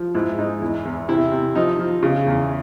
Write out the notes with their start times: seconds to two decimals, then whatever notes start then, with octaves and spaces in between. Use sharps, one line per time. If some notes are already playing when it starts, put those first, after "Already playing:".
Already playing: F3
0.15 G#2 E4
0.38 G#2 D#4
0.62 E2 E4
0.85 E2
1.08 C3 E4
1.32 C3
1.55 F3 D#4
1.79 F3
2.03 C#3
2.26 E2